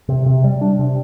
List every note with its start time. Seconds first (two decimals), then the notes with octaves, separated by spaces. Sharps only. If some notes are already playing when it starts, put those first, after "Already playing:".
0.08 C3
0.26 C3
0.44 G3
0.61 D4
0.79 C3